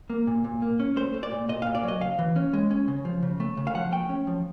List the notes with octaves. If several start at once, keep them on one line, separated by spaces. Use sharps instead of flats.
A#3
A#2
A#2
A#3
C#4
A3 C5
A3
D5
A#2
A#2 D#5
F5
A#2
D5
F#3 D#5
C#3 F5
E3
C#4
G#3
C#4
C#3
F3
C#3
A3
C#3
F5
F3 F#5
A3 G5
C#4
F3